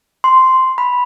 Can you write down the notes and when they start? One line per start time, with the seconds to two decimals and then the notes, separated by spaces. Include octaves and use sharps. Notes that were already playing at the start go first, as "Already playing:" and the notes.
0.24 C6
0.78 B5